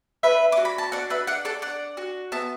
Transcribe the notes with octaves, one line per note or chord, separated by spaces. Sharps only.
D4 B4 E5
F#4 D6
B5
A5
D4 D5 F#5
B4 E5
D4 D5 F#5
A4 D5
D4 D5 F#5
F#4
B3 E5 A5